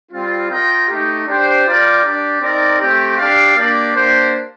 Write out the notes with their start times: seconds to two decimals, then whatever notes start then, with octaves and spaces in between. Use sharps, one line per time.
0.12 G3 C4 F4
0.50 F4 A#4 D#5 G5
0.89 A3 D#4 G4
1.27 D4 G4 C5 G5
1.66 F4 A#4 D5 G5
2.04 D4 G4 D5
2.41 C4 D#4 A#4 D5
2.81 A3 C4 G4
3.18 D4 G4 D5 F5
3.56 A#3 D4 G4 D5
3.96 A#3 D4 G4 C5